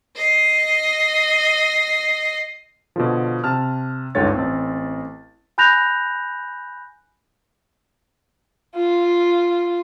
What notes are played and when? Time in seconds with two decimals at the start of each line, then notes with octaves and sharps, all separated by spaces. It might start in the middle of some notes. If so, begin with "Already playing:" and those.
0.17 D#5 C7
2.96 B2 D3 F3
3.44 C3 A5 F6
4.15 G1 C#2 G#2 D3 C#5 A6
4.34 A1 C4
5.58 G#5 B5 F#6 G6 A#6 F7
8.76 F4